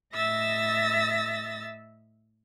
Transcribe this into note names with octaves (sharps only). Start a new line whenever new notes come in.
A2 D#5 E5 E6 A6 A#6